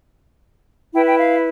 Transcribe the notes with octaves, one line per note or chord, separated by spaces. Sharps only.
E4 B4 G5
G5
F5